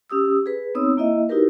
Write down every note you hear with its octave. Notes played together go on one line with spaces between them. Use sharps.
C#4 G4 D#6 E6
G#4 B4
B3 C4 D#4 C#5 D#6 E6
A#3 E4 D#5 E5
D#4 E4 F#4 G4 A#4 B4